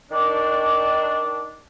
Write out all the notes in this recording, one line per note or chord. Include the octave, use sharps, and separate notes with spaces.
D#3 D4